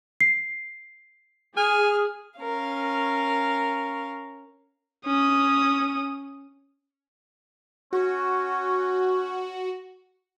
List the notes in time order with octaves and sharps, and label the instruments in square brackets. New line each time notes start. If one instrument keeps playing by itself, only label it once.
[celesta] C7
[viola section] G#4 [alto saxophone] G#5 [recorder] F6
[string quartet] C#4 A#4 F5
[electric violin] C#4 D#6
[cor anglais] C#4 [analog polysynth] F#4